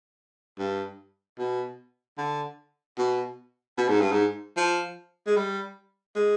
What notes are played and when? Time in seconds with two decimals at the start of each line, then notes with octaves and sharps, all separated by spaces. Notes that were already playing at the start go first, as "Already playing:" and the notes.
0.59 G2
1.39 B2
2.18 D3
2.98 B2
3.78 B2
3.88 G#2
4.01 G2
4.12 G#2
4.57 F3
5.27 G#3
5.36 G3
6.16 G#3